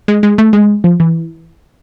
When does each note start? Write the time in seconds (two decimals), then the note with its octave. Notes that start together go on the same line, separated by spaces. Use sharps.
0.08 G#3
0.23 G#3
0.38 A3
0.53 G#3
0.84 F3
1.00 E3